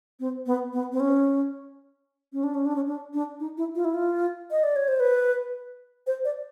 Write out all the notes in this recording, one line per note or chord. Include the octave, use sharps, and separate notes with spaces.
C4
B3
B3
C4
C#4
C#4
D4
C#4
D4
C#4
D4
D4
D#4
E4
F4
E4
F4
D#5
D5
C#5
C5
B4
C5
D5